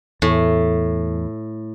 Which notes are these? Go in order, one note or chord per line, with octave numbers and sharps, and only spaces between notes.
E2 A2